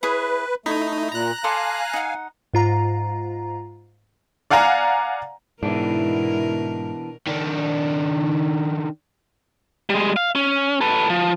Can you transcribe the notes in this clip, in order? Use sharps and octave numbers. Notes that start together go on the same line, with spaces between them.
E4 G#4 B4 C#5
A3 D#4 E4
A#2 A#5 F#6
A4 D5 F5 G#5 C6
D#4 F#5
G#2 F4 A#5
D5 F5 F#5 G#5 A#5
G#2 B2 E3 B3 D4 E4 A#4
D#3 D4
G3 G#3
F5
C#4
A4 B4
F3